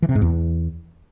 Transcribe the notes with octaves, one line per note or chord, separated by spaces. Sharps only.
E3
C3
G#2
E2